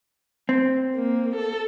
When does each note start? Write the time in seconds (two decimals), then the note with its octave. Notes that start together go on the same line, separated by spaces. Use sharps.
0.49 C4
0.95 A#3
1.35 A4